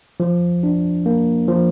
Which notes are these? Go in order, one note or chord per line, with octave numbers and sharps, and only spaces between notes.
F3
D4
A#3
F3